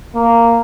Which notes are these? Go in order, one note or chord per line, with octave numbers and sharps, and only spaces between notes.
A#3